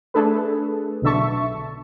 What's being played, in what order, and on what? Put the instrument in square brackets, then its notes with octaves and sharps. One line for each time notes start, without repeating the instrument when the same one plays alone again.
[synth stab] A3 D4 G#4 A4 B4
B1 B2 D3 E5 A5 C#6